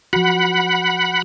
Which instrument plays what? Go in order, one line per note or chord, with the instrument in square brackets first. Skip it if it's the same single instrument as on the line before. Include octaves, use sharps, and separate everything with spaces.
[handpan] F3 F#4 [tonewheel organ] F#5 B5